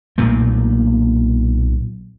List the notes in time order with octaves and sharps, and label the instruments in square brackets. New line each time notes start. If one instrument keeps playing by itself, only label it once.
[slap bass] B1 A#2 A3 A#3